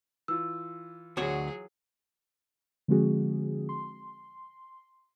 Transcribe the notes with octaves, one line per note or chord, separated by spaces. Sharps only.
E3 F4 E6
D2 F#3 F#4 G#4 C#5
D3 F3 G#3 C4 F#4 G#4
C6